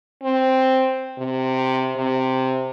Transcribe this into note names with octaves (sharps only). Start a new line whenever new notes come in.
C4
C3
C3